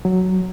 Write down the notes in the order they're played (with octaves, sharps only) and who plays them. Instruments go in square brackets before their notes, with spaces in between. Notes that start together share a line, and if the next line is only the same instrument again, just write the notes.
[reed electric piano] F#3